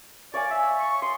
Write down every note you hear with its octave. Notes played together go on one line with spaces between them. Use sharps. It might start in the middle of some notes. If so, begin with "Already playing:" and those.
C#5 D5 F5 G#5
E5
C#6
C6 D#6